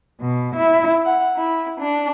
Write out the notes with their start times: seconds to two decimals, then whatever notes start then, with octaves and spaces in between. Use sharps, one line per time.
0.20 B2
0.56 E4
1.04 F#5
1.35 E4
1.78 D4